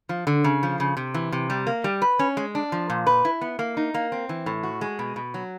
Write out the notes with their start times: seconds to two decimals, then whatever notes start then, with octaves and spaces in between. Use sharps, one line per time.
0.09 F3
0.27 D3
0.44 C#3
0.63 F3
0.80 C#3
0.97 C3
1.14 E3
1.32 C3
1.50 G3
1.67 A#3
1.84 G3
2.02 B4
2.19 C#4
2.37 G#3
2.55 D4
2.72 F3
2.90 A#2
3.07 B4
3.25 E4
3.41 B3
3.59 A#3
3.77 D#4
3.94 A#3
4.12 C4
4.29 E3
4.46 A2
4.63 F#4
4.81 G#3
4.99 B2
5.16 B2
5.34 F#3